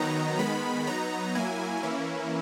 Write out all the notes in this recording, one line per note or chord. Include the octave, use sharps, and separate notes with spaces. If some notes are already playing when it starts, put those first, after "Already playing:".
Already playing: D#3 F#3 B3 D#4 A#5
D#3 G#3 B3 B5
F#3 B3 D#4 A#5
F#3 A#3 E4 G#5
E3 A#3 C#4 E4